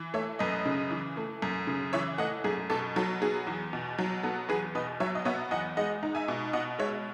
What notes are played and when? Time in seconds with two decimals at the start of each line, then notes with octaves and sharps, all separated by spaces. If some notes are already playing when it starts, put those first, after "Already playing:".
Already playing: E3
0.14 A3 C#5 E5
0.39 F#2 B4 D#5
0.65 C#3
0.90 E3
1.17 A3
1.42 F#2
1.67 C#3
1.93 E3 C#5 E5
2.18 A3 D#5 F#5
2.44 F#2 G#4
2.70 B2 A4
2.96 F#3 A4
3.21 B3 G#4
3.47 E2
3.73 B2
3.99 F#3
4.23 B3 A4
4.48 E2 G#4 B4
4.75 B2 B4 D#5
5.00 F#3 C#5 E5
5.15 D#5
5.25 B3 C#5 E5
5.51 E2 D#5 F#5
5.77 G#3 D#5 F#5
6.03 D#4
6.15 E5 G#5
6.28 B2
6.53 B2 D#5 F#5
6.79 G#3 C#5 E5